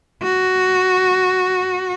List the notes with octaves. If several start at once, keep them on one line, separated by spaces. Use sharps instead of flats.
F#4